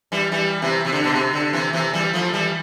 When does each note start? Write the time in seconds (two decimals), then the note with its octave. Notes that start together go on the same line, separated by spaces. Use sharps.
0.12 E3 G3
0.32 E3 G3
0.62 C3 E3
0.85 C3
0.92 D3
1.04 B2
1.13 C3
1.33 D3
1.53 C3 E3
1.73 C3 E3
1.93 E3 G3
2.13 F3 A3
2.33 E3 G3